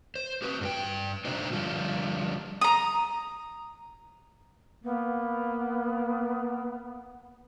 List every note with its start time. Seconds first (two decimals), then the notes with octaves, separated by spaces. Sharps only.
0.15 C5
0.42 F#4 G4 B4
0.61 G2 F#4 G5
1.25 C3 D4 D#4 F#4 C5
1.53 D3 F3 G3 F4
2.61 A#5 D#6
4.84 A#3 B3